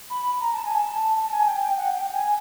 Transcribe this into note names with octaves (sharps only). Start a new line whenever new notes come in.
B5
A#5
A5
G#5
A5
A5
G#5
G5
G5
F#5
G5
G#5